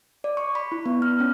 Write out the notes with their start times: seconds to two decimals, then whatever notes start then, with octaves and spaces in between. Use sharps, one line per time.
0.24 D5
0.37 C#6
0.55 B5
0.72 E4
0.86 B3
1.02 F6
1.20 C#4